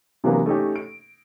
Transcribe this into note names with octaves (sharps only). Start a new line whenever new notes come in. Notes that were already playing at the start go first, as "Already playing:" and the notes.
C3 E3 F#3 A#3 B3 D4
A3 C#4 D#4 G4
D7